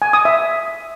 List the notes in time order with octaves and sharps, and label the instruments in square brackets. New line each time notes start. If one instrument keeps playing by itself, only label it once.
[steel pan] G#5
D#6
E5